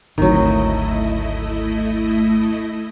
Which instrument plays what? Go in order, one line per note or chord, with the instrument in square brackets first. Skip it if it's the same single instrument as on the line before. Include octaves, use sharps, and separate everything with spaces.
[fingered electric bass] G#1 D2 C4 [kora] D#3 F#3 [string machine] A3 E4 D#5